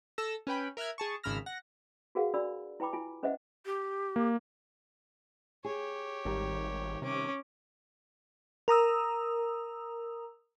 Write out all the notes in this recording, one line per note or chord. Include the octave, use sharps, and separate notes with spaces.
A4 E6 A#6
C#4 B4 G5 B5
A#4 E5 F6 F#6 G#6
G#4 A5 C#6
G#1 C#3 B5 E6 F6 A#6
F#5 A#6
F#4 G#4 A#4 B4 F5 F#5
D4 F#4 D5 B5 E6
E4 B4 G5 B5 D6
E4 F4 G#5
C#4 B4 C5 D#5 E5 F#5
G4
A#3
G4 G#4 C#5
G#1 D#3 G3
C3 C#4 D6
A#4 A#5 D#6 E6